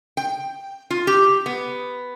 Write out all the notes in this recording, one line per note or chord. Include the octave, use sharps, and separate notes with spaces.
G5
F4
G4
B3